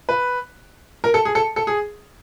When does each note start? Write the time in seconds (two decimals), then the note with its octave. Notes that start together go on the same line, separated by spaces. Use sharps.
0.09 B4
1.04 A#4
1.14 A4
1.25 G#4
1.35 A4
1.56 A4
1.67 G#4